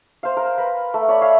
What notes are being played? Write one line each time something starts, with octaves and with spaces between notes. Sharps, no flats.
C5 F5
A#4
A#4 B4
A3
C#5 D5 B5
C#5 E5 F5